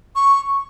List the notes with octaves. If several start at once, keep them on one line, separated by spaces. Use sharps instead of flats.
C#6